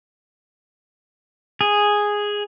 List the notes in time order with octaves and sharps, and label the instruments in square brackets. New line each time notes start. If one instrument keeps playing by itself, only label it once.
[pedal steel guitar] G#4